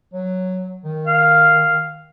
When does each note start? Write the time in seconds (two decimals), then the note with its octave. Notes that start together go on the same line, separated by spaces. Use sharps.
0.13 F#3
0.84 D#3
1.07 F5